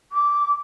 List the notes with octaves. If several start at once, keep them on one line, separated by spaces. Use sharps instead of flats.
D6